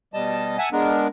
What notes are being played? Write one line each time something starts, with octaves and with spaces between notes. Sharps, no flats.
B2 G3 D#5 A5
E5 F#5 G#5 A5
G#3 B3 D4 A#4